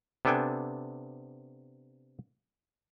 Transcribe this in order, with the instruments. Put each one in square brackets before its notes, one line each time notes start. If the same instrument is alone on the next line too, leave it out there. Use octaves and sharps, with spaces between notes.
[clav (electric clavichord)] C3 B3 D4 A4 G5 G#5